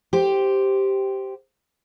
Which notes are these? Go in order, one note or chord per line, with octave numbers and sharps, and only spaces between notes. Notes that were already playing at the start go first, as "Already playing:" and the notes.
G4 C5